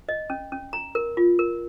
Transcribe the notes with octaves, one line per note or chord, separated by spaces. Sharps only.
D#5
C#4
C#4
A#5
A#4
F4
A#4